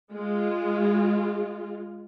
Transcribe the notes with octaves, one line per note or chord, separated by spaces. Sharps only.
G#3 F4